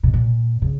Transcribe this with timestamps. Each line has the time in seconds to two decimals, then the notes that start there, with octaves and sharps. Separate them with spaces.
0.03 B2
0.14 A#2
0.62 C#3